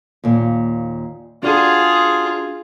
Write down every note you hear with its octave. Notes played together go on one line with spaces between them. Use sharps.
D#2 A#2
D4 F4 F#4 G#4 F#5